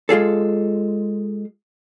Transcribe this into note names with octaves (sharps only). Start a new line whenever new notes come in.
G#3 F4 G#4 A4